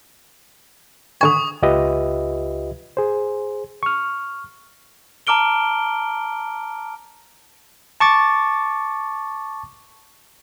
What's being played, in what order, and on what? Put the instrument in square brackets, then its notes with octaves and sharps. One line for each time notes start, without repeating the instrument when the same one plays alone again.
[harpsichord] D3 G#5 [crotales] C#6 D#6
[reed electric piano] C#2 F4 G4 B4 D#5 E5
G#4 C5
C#6 F6
[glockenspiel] A5 A#5 D6 F6 D7 G7
[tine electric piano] A5 C#6 D6 A6